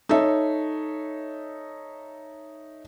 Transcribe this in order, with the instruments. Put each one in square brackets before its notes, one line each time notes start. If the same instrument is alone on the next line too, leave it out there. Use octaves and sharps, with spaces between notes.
[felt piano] D#4 A4 C#5 E5